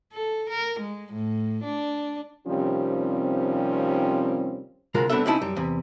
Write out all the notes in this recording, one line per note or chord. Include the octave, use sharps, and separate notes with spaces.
A4
A#4
G#3
A2
D4
D#2 C3 F3 G3 C4 C#4
D2 C3 G#3 F4 F#4 A#4
G3 B3 C4 D4 A4 E5
C#2 C4 C#4 D#4 E4 A5
F#2 G3
E2 C3